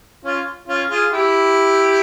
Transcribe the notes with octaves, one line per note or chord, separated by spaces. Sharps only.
C#4 F4
C#4 F4
F4 G#4
E4 G4